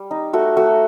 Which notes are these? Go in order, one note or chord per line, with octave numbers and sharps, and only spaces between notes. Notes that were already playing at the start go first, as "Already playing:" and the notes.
Already playing: G3
D#4
A3 F#4
A3 F#4